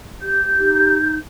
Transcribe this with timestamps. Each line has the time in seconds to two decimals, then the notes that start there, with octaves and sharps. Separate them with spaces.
0.22 G4 G6
0.55 D#4